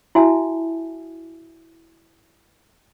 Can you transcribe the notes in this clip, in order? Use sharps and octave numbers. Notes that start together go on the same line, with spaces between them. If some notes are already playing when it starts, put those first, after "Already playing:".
E4 F#4 E5 G#5 A5